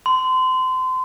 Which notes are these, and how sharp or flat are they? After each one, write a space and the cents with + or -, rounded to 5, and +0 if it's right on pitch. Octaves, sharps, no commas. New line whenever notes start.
C6 -30